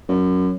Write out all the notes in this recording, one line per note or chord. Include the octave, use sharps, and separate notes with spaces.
F#2